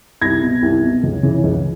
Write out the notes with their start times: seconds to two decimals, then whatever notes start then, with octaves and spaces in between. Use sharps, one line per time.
0.22 C2 G#6 A#6
0.43 B2
0.62 C2
0.82 B2
1.03 C#2
1.23 C#3 E3
1.43 C#2